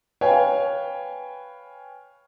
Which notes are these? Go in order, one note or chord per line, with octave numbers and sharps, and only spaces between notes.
B4 C#5 F5 G5 G#5